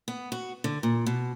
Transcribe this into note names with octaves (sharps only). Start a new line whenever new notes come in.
B3
F#4
D3
A#2
B2